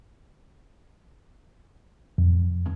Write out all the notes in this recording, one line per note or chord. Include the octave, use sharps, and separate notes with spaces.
F2